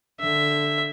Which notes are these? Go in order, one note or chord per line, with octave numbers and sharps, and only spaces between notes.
D3 E5